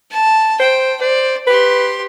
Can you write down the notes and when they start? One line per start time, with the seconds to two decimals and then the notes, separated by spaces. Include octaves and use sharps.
0.11 A5
0.60 C5 G5
1.01 C5 D5
1.47 G4 B4 C6